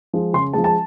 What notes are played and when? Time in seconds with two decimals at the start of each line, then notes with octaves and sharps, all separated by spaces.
0.13 F3 G#3
0.33 C#3 C6
0.53 F3 G#3 A5
0.64 A5